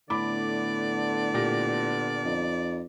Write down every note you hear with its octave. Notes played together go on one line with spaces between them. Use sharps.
A2 D3 B3 D5 B5 D6
A#2 G4 A#6
F2 D#4